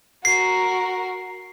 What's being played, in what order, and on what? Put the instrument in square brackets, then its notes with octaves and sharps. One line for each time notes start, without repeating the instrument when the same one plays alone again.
[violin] F#4 A#4 [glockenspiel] C7